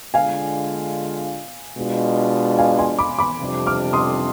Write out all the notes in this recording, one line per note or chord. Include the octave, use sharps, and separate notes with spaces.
D3 G#3 D4 F4 F5 G#5
B2 G#3 D4 F4
F5 G#5
G#5 C6
B5 D6
B5 D6
F2 C3 G3 D4
D6 F6
C6 D#6